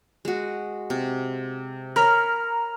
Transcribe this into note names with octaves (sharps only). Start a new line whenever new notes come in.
G#3 F#4
C3
A#4 C#5 A#5 B5 F6